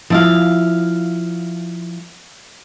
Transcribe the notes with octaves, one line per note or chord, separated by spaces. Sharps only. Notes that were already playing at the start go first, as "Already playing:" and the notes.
F3 E4 F5